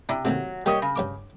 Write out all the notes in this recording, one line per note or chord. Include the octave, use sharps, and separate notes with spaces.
C3 D4 E4 B5
D#2 A2 C3 F#3
G3 A#3 G4 C#5 D#5
C#3
G2 C#5 D6